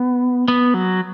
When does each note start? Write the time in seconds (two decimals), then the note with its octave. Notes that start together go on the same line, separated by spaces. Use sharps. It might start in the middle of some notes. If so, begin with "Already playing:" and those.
Already playing: B3
0.48 B3
0.74 F#3